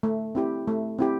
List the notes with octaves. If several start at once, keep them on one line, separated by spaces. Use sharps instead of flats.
A3
C4 E4 G4
A3
C4 E4 G4